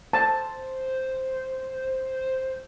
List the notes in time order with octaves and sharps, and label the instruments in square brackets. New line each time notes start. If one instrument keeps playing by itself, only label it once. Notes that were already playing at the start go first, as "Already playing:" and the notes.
[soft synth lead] C5 [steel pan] A5